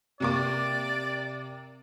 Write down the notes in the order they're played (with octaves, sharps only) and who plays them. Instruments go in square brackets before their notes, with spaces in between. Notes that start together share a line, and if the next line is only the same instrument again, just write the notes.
[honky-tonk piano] C3 A#3 D6 [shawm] D5